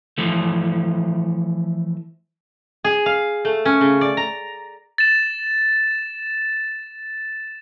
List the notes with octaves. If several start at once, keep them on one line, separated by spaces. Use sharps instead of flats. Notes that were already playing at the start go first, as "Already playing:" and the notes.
E3 F3 A3
G#4
F5
A3
C#4
C#3
D5
A#5
A6 E7